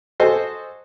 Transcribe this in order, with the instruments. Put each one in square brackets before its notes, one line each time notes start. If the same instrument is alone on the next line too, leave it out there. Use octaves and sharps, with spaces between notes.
[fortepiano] F#4 G#4 A4 C5 D#5